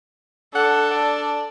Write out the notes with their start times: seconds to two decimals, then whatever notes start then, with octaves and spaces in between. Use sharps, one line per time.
0.55 D4 A4 F#5
0.91 D5